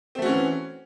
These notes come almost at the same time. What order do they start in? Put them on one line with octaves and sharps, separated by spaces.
C4 A3 F#4 C#4 E3